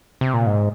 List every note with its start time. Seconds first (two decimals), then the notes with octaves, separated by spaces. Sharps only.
0.21 C3
0.34 A#2
0.46 G#2